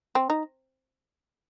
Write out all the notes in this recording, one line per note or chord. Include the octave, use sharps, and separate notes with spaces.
C4
D#4